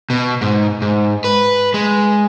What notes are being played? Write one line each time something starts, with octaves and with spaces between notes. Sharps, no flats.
B2
G#2
G#2
B4
G#3